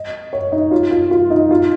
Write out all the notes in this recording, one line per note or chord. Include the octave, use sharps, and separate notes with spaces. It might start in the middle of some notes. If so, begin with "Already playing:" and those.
Already playing: D#5
C#5
D#4
F4
F4
F4
D#4
F4